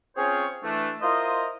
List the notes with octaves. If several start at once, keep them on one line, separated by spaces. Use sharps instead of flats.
C4 C#4 F4 G#4 C5 C#5
E3 A3 D4
E4 F4 A#4 C5 D#5